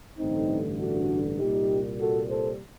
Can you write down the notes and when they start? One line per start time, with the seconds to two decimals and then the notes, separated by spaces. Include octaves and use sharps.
0.18 A1 G2 D3 A3 C4 D#4
0.79 D4 F#4
1.39 C2 A#2 G3 A#3 D#4 G4
1.99 F#4 A4
2.29 A4 C5